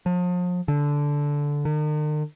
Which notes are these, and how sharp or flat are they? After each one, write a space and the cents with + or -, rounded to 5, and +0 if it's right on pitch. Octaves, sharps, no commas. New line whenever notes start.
F3 +40
D3 -10
D#3 -45